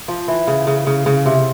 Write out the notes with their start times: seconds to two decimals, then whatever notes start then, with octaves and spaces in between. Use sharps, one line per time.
0.08 F3
0.28 E3
0.47 C#3
0.67 C#3
0.87 C#3
1.06 C#3
1.26 C3